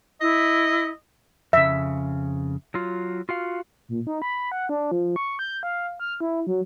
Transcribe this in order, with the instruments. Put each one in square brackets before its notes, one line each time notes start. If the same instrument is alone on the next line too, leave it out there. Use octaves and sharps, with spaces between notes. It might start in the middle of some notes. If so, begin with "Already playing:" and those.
[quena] E4 [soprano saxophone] D#5
[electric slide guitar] F2 C#3 [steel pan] E5
[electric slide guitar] F#3 F4
F4 F#4 F5
[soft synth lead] A#2
D#4
B5
F#5
D4
F3
C#6
G6
F5
F6
E4
F#3